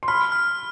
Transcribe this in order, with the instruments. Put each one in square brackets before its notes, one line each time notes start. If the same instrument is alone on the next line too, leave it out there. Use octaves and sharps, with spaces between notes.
[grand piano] C6
[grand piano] B5 [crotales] F6
[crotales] F6